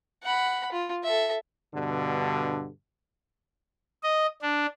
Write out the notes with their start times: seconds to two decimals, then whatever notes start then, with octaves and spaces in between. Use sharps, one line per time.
0.23 F#5 B5
0.72 F4
1.03 A4 E5
1.74 G2 B2 D3
4.03 D#5
4.42 D4